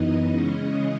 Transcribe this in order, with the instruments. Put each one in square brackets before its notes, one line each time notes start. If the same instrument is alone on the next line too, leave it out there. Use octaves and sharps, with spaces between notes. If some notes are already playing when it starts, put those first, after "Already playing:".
Already playing: [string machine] F#2 E3 B3 D#4 D#5
C#3 E3 G#3 C#4